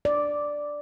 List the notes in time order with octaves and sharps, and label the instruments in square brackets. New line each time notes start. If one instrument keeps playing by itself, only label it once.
[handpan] D5